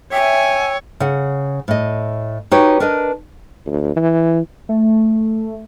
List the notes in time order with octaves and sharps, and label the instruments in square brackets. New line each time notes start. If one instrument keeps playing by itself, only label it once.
[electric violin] C#5 [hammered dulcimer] E5 [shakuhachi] G5 [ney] G#5
[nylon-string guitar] C#3 F#5
A2 D#5
D#4 F#4 G4 B4 C#5
D4 A#4 B4 D#5
[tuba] D2
E3
[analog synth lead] A3